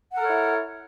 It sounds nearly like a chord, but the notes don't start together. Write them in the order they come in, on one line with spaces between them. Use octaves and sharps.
F#5 A#4 A4 C#5 E4